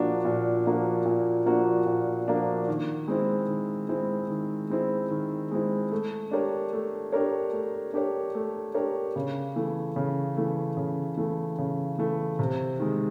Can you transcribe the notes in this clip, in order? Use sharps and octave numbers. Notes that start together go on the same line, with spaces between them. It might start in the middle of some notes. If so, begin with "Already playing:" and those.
Already playing: A#2 F3 A#3 D4 F#4
A#2
F3 A#3 D4 F#4
A#2
F3 A#3 D4 F#4
A#2
F3 A#3 D4 F#4
D#3
G#3 C4 E4
D#3
G#3 C4 E4
D#3
G#3 C4 E4
D#3
G#3 C4 E4
A3
D4 G4 A#4 C#5
A3
D4 G4 A#4 C#5
A3
D4 G4 A#4 C#5
A3
D4 G4 A#4 C#5
C#3
E3 A3
C#3
E3 A3
C#3
E3 A3
C#3
E3 A3
C3
D#3 G#3